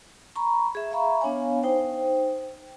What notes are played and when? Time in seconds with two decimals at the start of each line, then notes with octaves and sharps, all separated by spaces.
0.36 A#5 B5 C#6
0.75 G#4 E5
0.91 E5 F5 A#5 B5 C#6
1.21 B3 D4 C#5 F5 G#5
1.63 D#4 C5 G5